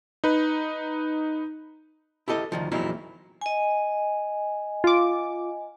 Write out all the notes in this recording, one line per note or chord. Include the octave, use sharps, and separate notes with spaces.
D#4 B4
E4 G4 A4 D#5
D2 D#3 F3
E2 A#2 F3 F#3 D#4 E4
D#5 G#5
F4 D6